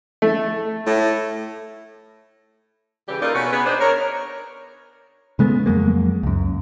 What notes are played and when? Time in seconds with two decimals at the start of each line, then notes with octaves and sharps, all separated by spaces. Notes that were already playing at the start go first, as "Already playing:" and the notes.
0.22 A3
0.86 A2 E4
3.09 C#3 E3 G4
3.22 A#3 D#4 F4 A4 A#4 D5
3.35 B2 C#4 F#4 B4
3.52 B3 G#4 B4
3.66 D4 D#4 C5
3.80 A#4 C#5
5.39 C#3 G#3 A3 B3
5.66 F2 F#3 G#3 A#3
6.23 C#2 F#2